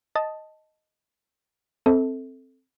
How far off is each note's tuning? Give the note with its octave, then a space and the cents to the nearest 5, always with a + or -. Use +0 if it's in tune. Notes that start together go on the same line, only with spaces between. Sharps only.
D#5 +0 A5 +0
C4 +5 A4 +0 E5 -40